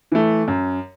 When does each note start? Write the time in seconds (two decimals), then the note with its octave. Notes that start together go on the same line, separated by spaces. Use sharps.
0.12 E3 A3
0.48 F#2